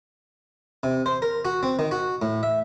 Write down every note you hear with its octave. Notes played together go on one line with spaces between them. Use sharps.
C3
C5
A#4
F#4
C4
D#3
F#4
A2
E5